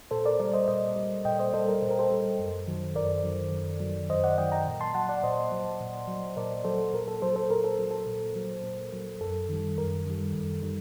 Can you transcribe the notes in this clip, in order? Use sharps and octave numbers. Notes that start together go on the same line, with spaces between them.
A#2 A4 C5
A#4 D5
G3 A#4 D5
C5 D#5
A#2 C5 D#5
G3
A#2 D#5 G5
C5 D#5
G3 A4 C5
A#4
A#2 C5
A#4
A4 C5
G3
F#2
D#3 F#3
F#2 A#4 D5
D#3 F#3
F#2
F#3
D#3
F#2 C5 D#5
D5 F#5
D#3 F#3 D#5 G5
G5 A#5
A#2
A5 C6
F#3 F#5 A5
D5 F#5
A#2 C5 D#5
F#3
A#2
F#3
A#2 A#4 D5
F#3 A4 C5
A#2 A#4
A4
F#3 A4 C5
A4 C5
A#2 A#4
A4
F#3
A4
A#2
F#3
A#2
F#3
F#2 A4
D#3 G3
F#2 A#4
D#3 G3
F#2
D#3 G3